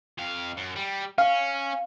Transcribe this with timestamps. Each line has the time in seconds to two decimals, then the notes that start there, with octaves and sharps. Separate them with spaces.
0.18 F2 F5
0.57 F#2
0.76 G3
1.18 C#4 F5